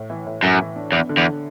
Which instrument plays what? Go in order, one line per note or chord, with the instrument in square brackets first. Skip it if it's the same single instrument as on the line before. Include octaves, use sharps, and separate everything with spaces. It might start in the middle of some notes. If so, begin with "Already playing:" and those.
Already playing: [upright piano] A2
E3
A2
[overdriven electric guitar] F#2 [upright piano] A2
[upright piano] E3
D4
[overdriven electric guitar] E2 [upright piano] B3
[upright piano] D3
[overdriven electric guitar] E2